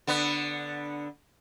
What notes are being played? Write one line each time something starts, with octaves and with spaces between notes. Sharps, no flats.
D3 B3